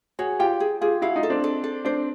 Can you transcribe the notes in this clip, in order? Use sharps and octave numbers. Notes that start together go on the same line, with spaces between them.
F#4 G#4 C#5
F4 G4 G5
G#4
F4 G4 G#4
E4 F#4 F5
D#4 F4
A4
C4 D4
A4
A4
C4 D4 C5